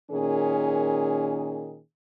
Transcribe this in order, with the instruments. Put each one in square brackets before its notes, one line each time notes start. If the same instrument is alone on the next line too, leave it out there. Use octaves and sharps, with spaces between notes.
[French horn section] A#2 D#3 C#4 G#4